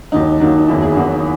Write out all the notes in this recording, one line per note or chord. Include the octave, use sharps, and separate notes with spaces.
D#2 D#3 F#3 D#4
D#2 D#3 F#3
D#4
F#1 E2 D#3 F#3 E4
G#4
F#1 E2 D#3 F#3 F#4